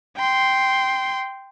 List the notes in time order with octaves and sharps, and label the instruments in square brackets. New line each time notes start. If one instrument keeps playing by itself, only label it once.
[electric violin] G5 C6